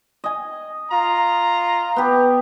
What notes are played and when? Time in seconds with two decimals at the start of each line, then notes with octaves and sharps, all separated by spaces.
0.24 D#5 G#5
0.91 F4 A#5
1.96 B3 G4